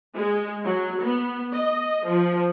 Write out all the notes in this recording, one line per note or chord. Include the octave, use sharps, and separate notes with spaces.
G#3
F#3
B3
D#5
F3